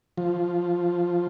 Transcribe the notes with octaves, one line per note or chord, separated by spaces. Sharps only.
F3